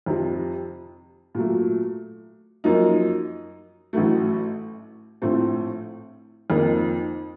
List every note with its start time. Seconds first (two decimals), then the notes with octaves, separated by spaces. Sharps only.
0.06 F2 C3 F3
1.35 A#2 F#3 A3
2.64 F#2 F3 A#3 D#4
3.93 A1 A2 F#3 A3
5.22 A#1 A2 F3 A3 C4
6.50 F2 D#3 A#3